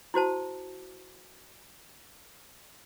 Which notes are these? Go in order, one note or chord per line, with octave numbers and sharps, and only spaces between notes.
E4 F#4 C5 A5